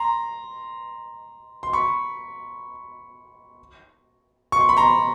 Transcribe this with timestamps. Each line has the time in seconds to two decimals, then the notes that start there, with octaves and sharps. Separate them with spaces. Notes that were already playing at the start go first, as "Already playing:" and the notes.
Already playing: A#5 C6
1.63 C6
1.73 B5 C#6
4.52 C#6
4.60 C6
4.69 B5
4.77 A#5 C6